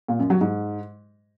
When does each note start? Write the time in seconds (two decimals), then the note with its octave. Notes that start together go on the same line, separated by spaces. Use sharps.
0.08 A#2
0.19 F#2
0.30 F#3
0.41 G#2